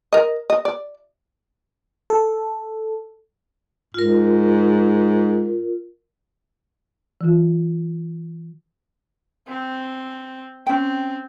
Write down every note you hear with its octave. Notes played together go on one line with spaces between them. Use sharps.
A#4 D#5
D#5
D5
A4
G#2 F4 A#4
E3 F#3 F4
C4
C4 C#4 G5